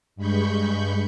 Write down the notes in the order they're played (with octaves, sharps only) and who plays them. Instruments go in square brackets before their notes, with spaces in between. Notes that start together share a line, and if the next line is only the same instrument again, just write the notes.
[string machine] G2 G#3 B5 C#6 G6